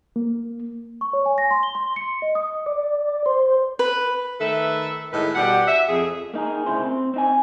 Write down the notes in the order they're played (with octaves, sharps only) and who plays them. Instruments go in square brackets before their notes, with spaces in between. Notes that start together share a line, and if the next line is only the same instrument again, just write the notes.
[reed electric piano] A#3
[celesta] C#6
C#5
G#5
A#6
C6
G7
C6
C#7
D#5
D#6
[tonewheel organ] D5
C5
[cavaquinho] B4
[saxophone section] D#3 A3 A4 B4 E5
A2 D#3 G#3 A3 D#4 B4
B2 G3 G4 F#5
E5
F2 G#4
[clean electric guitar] A#3 D#4 G#4 A#4
D2 A2 C#3 E4 C5
C4
C4 D#4 G#5